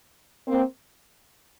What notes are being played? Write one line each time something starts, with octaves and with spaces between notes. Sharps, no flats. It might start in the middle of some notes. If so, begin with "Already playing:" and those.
A#3 C4